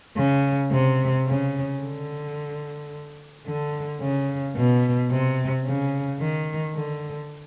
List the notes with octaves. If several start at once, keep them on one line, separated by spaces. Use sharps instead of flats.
C#3
C3
C#3
D3
D3
C#3
B2
C3
C#3
D#3
D3